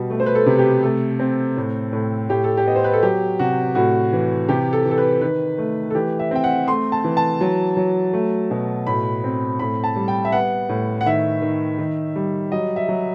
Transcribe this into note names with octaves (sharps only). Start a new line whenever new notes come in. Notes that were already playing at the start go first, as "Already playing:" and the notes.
Already playing: B2 G3
A3
C5
B4
A4
C3
G4
A3 A4
C4
A2
A2
A2 G4
A4
G4
B3 D#5
C5
B4
A4
F#3 G4
C3 F#4
A2 F#4
E3
C3 G4
A4
E3
A4
B4
D#3 B4
A3
A4
E3 G4
E5
C4 G5
F#5
A3 C6
A5
E3
A5
F#3
F#3
A3
B2
A2 B5
C4
A2 B5
A5
G3
G5
E5
B3 F#5
A2
F#5
D#3 E5
D#3
D#3
G3
F#3 D#5
E5
F#3